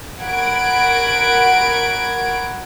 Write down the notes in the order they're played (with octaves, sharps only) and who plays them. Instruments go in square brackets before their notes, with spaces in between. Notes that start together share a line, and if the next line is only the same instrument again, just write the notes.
[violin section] F#4 A#4 F#5 B5 G#6 D7